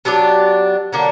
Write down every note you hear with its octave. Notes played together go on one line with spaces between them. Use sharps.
F#3 B3 D4 G4
D3 F#3 A#3